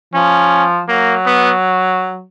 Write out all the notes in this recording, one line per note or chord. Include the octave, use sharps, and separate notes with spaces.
F3 C#4
F#3 A#3
B3